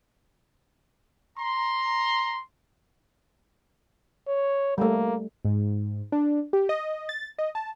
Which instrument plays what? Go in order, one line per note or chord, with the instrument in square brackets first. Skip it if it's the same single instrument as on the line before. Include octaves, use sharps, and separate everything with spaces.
[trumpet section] A#5 C6
[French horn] C#5
[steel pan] G3 A3 [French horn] A#3
[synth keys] G#2
D4
G4
D#5
A6
D#5
A5